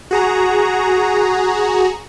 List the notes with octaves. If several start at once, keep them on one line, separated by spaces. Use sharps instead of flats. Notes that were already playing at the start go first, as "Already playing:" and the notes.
F#4 G#4 A#5